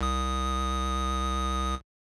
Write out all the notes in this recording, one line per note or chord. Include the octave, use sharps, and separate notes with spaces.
C2 D#6